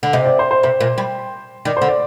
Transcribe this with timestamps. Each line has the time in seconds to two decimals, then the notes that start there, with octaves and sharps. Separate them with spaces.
0.03 D3
0.13 C3 D#5
0.26 D5
0.39 C5
0.51 C5
0.63 C3 C5
0.80 A#2
0.98 G3
1.65 D#3 D5
1.77 D3 C5
1.88 D5